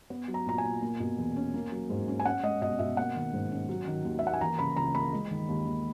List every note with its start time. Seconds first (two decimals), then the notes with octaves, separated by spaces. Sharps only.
0.10 B3
0.28 F#3
0.34 A#5
0.46 A#2 A#5
0.58 G#5
0.64 A#2
0.82 A#3
1.00 B2
1.18 E2
1.36 C#4
1.54 A#3
1.72 F#3
1.90 G#2
2.08 C#4
2.20 G#5
2.25 C#4 F#5
2.43 G#3 D#5
2.61 B2 D#5
2.79 B2 E5
2.97 A#3 F#5
3.16 D#3
3.33 G#2
3.52 C#4
3.69 F#3
3.87 D#3
4.05 D#2
4.19 E5
4.23 A#3 F#5
4.33 G#5
4.41 E3 A#5
4.59 C#3 B5
4.76 C#2 A#5
4.95 A#3 B5
5.13 G#3
5.31 D#3
5.49 D#2
5.66 D#2